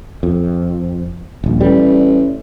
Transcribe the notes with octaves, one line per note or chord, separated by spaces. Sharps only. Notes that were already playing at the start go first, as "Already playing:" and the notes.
F2
D#1 A#1
A1 G3